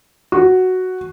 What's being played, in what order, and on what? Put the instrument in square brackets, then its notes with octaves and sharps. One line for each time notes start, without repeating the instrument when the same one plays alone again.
[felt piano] F#4